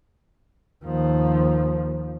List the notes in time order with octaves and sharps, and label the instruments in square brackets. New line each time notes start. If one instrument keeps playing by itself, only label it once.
[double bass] D#2 F3